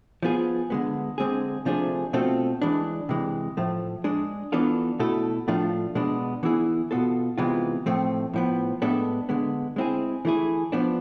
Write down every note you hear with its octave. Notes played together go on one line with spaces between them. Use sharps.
F3 B3 F4 G#4
D3 G#3 B3
D3 G#3 C4 G#4
C3 F3 A3 D4 G#4
B2 A3 C4 F4 A4
E3 G#3 D4
C3 E3 G#3
A2 F3 A3
G#3 D4 G#4
E3 B3 D4 F4 A4
B2 A3 E4 A4
A2 F3 A3 D4 F4
B2 G#3 B3 D4
E3 B3 E4 G#4
B2 B3 F4 A4
C3 E3 G#3 B3 F4
A2 F3 A3 C4
A2 F3 B3
A2 G#3 B3 D4 A4
D3 G#3 B3
G#3 C4 E4 G#4
E3 A3 E4 G#4
F3 B3 D4